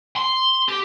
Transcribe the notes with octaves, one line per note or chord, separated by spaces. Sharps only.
C6
G4